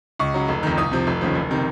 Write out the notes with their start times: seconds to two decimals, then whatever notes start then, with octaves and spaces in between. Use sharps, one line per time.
0.19 C#2 C#6
0.34 C#3 F#3
0.48 F1
0.63 F2 D#3
0.77 C2 D#6
0.92 C3 F3
1.07 F1
1.21 D#2 C#3 F3
1.35 F#1
1.51 C3 D#3